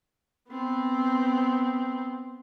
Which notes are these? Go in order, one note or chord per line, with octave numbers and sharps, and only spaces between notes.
B3 C4